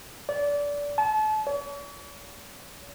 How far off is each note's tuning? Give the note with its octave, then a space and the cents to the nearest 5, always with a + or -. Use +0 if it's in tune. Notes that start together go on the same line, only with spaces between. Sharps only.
D5 -25
A5 -35
C#5 +45